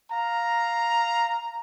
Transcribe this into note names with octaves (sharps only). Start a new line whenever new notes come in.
F5 A#5